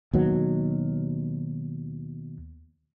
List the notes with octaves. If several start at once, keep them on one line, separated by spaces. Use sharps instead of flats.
D#2 B2 F#3